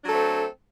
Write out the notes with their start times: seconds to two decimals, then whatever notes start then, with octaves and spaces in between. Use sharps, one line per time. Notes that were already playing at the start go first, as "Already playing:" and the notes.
0.03 D4
0.06 F#3
0.08 A4
0.11 A3
0.13 C4